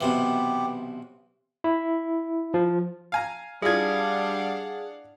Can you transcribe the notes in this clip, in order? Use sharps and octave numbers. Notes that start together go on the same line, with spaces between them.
B1 C3 E3 B3 G4
E4
F3
F5 G#5 A#5
G3 D4 E4 F4 G#4 F5 F#5 G#6